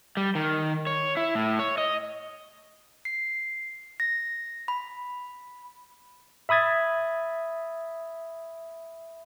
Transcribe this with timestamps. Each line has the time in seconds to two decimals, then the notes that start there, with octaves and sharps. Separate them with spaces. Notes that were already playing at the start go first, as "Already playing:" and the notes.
0.17 G3
0.35 D#3
0.87 C#5
1.17 E4
1.35 A2
1.59 C#5
1.78 D#5
3.05 C7
4.00 A#6
4.68 B5
6.49 E5 B5 D#6 G#6 A6